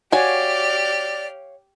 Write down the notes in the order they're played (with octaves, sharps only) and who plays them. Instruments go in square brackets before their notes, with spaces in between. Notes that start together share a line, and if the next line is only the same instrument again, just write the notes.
[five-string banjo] F#4 G#5 [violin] G4 F6 [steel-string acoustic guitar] C#5 F5 [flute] D5